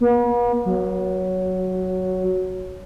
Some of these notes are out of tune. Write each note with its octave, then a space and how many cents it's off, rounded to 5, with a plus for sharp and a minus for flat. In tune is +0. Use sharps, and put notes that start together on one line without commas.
B3 -45
F#3 +5